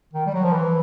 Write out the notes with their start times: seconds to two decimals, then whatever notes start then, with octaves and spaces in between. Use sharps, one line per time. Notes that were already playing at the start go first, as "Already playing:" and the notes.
0.13 D#3
0.26 G3
0.34 F#3
0.44 F3
0.53 E3